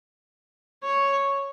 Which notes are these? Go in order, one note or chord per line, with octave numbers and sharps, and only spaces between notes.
C#5